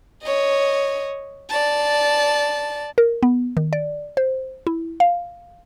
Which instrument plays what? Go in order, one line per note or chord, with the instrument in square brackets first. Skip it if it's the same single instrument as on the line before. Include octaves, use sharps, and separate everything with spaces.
[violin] C#5 D#5
D5 A5
[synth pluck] A#4
B3
D#3
D5
C5
E4
F5